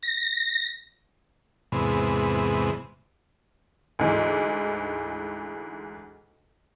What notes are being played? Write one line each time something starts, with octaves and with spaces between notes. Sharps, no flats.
A#6
E2 G#2 C3 B3
D2 G#2 E3